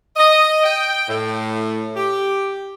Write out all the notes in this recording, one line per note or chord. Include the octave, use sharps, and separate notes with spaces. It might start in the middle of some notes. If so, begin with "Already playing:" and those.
D#5
G5
A2
G4